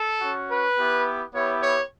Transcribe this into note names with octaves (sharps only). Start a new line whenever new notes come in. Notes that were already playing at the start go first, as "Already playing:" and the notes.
Already playing: A4
C#4 F#4
B4
B3 E4 G4
B3 E4 G4 C#5
C#5